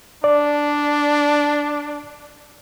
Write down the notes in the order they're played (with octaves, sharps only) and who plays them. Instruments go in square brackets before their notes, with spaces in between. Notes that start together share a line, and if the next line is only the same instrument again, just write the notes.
[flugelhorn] D4 [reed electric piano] D5